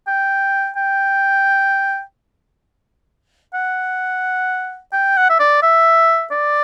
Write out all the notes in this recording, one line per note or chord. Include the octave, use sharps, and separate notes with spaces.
G5
G5
F#5
G5
F#5
E5
D5
E5
D5